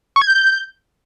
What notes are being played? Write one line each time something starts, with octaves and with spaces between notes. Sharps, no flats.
C#6
G#6
G6